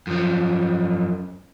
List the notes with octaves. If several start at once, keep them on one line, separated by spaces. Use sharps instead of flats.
F#2 F3